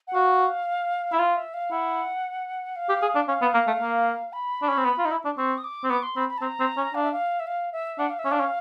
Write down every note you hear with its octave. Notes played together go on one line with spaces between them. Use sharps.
F#5
F#4 F5
E4 E5
F4 F5
E5
F5
E4 F#5
F5
G4
G#4
D4
C#4 F5
B3
A#3
A3
A#3
B5
D4
C#4
C4
B3
F4
D#4
E4
D4
C4 C#6
D#6
D6
C4
B3 D6
C6
C4 B5
B5
A5
C4 A#5
C4
C#4
D4 F5
E5
F5
E5
F5
E5
D4 F#5
F5
E5
C#4
D4 F5
C#4